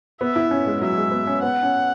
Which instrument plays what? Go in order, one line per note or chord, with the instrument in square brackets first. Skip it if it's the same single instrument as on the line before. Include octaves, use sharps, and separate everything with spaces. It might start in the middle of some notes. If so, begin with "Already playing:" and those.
[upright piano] B3 [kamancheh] E5
[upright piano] E4
C#4
G#3
[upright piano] F#3 [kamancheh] E5
[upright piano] G#3
B3
C#4
[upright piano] B3 [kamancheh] F#5
[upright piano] C#4